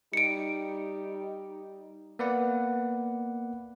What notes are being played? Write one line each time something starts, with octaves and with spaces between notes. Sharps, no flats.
G3 D#4 C#7 D7
A#3 B3 B4 D5 F#5